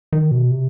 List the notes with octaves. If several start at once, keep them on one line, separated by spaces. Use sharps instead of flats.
D#3
B2
C3